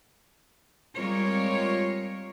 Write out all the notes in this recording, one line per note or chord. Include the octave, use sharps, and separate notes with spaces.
G3 G#3 C4 F4 A#4 C#5